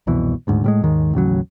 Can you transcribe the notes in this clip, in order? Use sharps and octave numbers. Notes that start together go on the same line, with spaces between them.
F1 C2 B2 E3
D#1 D2 G#2
A2 G3 G#3
D#2 G#2 D#3 G#3
A1 D#2 C#3 F#3